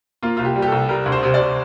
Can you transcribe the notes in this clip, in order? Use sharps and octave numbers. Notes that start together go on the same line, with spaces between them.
A#3 F4
C2 F4
G4
G3
G4
C2 A4
G3 A#4
D2
C5
C3
D5
C3